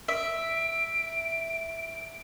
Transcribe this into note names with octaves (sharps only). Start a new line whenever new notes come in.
E5 D7